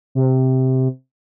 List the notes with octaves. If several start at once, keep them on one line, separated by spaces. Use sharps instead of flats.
C3